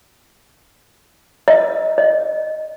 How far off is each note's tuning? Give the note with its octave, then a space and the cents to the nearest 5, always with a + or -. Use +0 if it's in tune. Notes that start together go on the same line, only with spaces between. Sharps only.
D#5 +20
D#5 -5